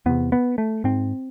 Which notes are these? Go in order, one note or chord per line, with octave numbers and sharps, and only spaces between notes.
E2 C3 B3
B3
A3
G#2 C4